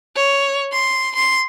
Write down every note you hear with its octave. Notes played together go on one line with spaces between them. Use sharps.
C#5
C6
C6